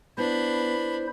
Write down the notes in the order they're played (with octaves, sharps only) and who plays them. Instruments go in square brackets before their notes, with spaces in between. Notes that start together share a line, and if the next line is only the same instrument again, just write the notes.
[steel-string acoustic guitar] B3 [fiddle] D4 B5 [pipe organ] E4 C5